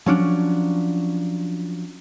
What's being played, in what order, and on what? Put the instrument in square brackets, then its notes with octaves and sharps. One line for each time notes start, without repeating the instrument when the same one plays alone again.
[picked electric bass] F3 F#3 C#4 D4